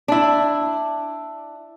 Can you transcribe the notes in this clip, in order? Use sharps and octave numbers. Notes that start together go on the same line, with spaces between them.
D4 E4